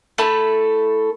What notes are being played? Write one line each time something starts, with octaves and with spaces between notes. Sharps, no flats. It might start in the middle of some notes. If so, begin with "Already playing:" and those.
A3 E4 A4 B5